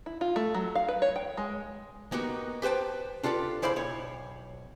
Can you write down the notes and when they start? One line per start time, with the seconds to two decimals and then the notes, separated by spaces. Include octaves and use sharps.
0.06 E4
0.21 F4
0.36 A3
0.55 F#3
0.75 F5
0.88 B4
1.02 C#5
1.16 G5
1.37 G#3
2.12 A#3 B3 D#4 F#4 G4
2.62 G4 B4 C5 G5 A5
3.23 D4 F4 G4 A4 B4
3.62 C#3 E4 C5 D5 F5 B5
3.76 B1 C#5